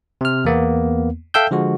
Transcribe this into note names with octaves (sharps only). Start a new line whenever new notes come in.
C3 F6
E2 A#3 B3
A4 E5 F5 G5 E6 G6
D3 F3 G#3 F#4